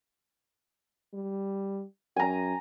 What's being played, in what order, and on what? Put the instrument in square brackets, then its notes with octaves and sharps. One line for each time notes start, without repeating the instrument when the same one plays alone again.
[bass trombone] G3
[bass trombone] F#2 [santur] G#5 A#5